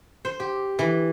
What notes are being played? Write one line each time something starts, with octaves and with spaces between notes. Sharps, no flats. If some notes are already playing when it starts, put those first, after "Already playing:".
C5
G4
E3